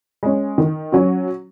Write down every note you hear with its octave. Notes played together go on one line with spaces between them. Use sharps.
G#3 C#4
D#3
F#3 C#4 F#4